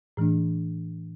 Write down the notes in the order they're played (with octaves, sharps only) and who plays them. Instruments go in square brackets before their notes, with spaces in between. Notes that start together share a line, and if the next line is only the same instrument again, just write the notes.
[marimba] A2 E3 A3 D4